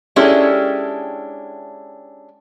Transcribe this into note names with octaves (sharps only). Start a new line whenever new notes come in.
G#3 C#4 D4 E4 G4 A4